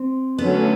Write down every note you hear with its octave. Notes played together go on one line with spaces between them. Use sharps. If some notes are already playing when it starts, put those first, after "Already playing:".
Already playing: C4
D3 F#3 A3 B3 C#4